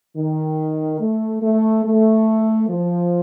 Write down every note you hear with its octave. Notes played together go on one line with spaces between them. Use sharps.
D#3
A3
A3
A3
F3